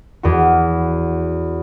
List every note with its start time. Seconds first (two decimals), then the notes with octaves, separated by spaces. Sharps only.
0.23 E2 F#4